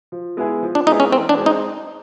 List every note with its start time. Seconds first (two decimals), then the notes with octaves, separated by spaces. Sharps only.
0.12 F3
0.37 G#3 B3 E4 G#4
0.62 F3
0.75 D4
0.87 G#3 B3 D#4 E4 G#4
1.00 C#4
1.13 E3 C4
1.29 D4
1.37 G#3 C4
1.46 D#4